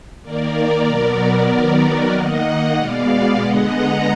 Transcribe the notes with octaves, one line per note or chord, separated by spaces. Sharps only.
D#3 A#3 A#4 D5
B2 F#3 B3
D#3 F#3 B3 A#4 D5
D#3 A#3 D#5 F#5
B2 G#3 B3 D5 F5
D3 G#3 B3 D#5 F#5
F#5 A#5